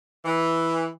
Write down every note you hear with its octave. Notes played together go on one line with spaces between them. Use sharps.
E3